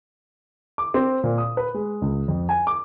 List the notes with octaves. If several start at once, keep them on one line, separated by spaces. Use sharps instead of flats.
D6
C4
A#2
D#6
B4
G#3
C#2
F2
G#5
D6